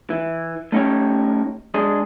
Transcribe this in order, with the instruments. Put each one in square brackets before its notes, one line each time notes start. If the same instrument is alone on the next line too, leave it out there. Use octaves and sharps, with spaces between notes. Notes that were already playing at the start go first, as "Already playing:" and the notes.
[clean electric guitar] E3
A3 C#4 D#4 G4 C#5
G#3 D4 G#4 D#5